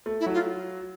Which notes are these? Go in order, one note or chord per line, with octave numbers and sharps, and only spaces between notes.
A3
E4
F#3
F4